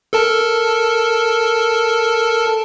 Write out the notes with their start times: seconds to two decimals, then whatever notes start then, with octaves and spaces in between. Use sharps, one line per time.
0.13 A4 A#4 A5